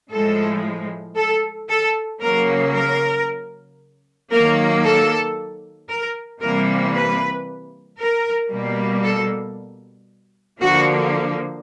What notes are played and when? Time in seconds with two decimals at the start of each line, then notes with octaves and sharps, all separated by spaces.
0.11 A2 F3 G#3 A4
1.16 A4
1.69 A4
2.21 C#3 F#3 A#3 A#4
2.73 A#4
4.31 D#3 F#3 A#3 A#4
4.84 A4
5.88 A#4
6.40 C3 E3 G3 A#3 A#4
6.93 B4
7.98 A#4
8.50 B2 G3 A#3
9.03 A4
10.60 D3 F3 A#3 F#4